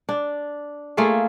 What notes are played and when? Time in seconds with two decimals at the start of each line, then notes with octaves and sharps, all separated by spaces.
0.09 D4
0.97 A3 A#3 F4 G#4